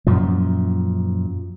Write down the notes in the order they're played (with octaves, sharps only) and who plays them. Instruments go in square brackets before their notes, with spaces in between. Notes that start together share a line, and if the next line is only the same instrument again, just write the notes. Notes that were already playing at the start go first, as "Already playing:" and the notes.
[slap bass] F#2 A#2 F3